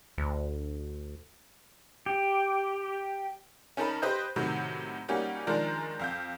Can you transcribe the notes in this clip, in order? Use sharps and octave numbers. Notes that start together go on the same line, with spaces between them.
D2
G4
C#4 D#4 A#4 A5 B5
G4 B4 C5 D#5 G6
A2 C3 D#3 F#3
G3 A#3 C#4 D#4 F#4 G4
D#3 F3 G#3 D4 A#4
F2 F5 G6